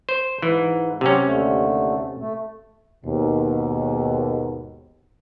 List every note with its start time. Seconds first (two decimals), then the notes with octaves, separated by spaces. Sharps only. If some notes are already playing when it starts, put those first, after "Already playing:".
0.09 C5
0.42 G#2 E3
1.01 C3 F#3 C#4 G4
1.26 D#2 D3 A3
2.20 A3
3.05 D#2 G#2 B2